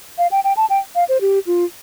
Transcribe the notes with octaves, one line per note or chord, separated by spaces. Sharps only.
F5
G5
G5
A5
G5
F5
C5
G4
F4